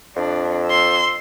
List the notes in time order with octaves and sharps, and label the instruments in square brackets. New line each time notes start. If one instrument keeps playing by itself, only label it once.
[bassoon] F2 [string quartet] D4
[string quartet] C6 E6